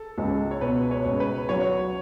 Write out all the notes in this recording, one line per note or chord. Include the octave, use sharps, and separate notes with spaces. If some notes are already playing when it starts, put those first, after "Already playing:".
Already playing: A4
C#2
C#5
B2 B4
C#5
C#2
B4
F#3 C#5